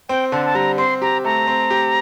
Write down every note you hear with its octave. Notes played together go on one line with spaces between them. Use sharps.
C4 G5
D3 A5
A5
G3 A#5
C4 C6
G4 A#5
A3 A#5
C4
G4